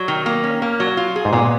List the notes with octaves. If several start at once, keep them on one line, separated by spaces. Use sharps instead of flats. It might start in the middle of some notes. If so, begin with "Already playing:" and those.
Already playing: F#3
D#3
A#3
C#4
A#3
F#3
F4
G#4
G#2
A#2 B3